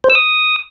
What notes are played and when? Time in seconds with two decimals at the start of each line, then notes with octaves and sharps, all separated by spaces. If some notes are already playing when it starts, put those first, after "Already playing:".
0.04 C5
0.10 E6
0.15 D#6